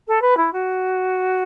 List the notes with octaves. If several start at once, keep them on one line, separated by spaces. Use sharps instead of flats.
A4
B4
E4
F#4